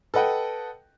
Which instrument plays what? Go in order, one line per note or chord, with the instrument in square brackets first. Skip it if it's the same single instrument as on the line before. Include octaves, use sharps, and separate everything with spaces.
[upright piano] A4 B4 D#5 F#5 G5